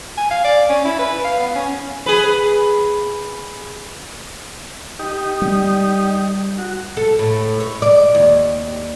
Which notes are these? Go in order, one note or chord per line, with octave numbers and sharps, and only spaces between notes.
G#5
F5
D5
C#4
E4
B4
F5
B3
C#4
G#4 B4
D#4 G4
G3
F#4
A4
A2
C#5
D5
D#2